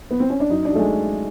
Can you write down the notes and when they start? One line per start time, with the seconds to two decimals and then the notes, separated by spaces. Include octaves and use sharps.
0.11 B3
0.20 C4
0.30 C#4
0.40 D4
0.50 F#2 D#4
0.65 D4
0.73 F#2 A3
0.79 G#3